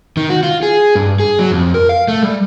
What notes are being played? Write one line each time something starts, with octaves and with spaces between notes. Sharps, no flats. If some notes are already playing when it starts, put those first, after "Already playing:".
D#3
F#4
F4
G#4
G2
G#4
F#3
F2
A#4
F5
A3
G3